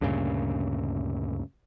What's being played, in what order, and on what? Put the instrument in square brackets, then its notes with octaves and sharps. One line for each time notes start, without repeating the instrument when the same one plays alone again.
[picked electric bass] D2 G2 A#2 C#3